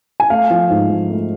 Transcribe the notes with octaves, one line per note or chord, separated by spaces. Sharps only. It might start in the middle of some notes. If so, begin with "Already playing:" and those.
G#5
A3 F5
F3
G#2
F3
A3